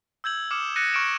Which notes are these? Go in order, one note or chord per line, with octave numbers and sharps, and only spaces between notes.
E6 G6 G#6 F#7
D6 D#6 F6 C#7 E7
F#6 A6 A#6 C#7 D#7
C#6 F6 D7 E7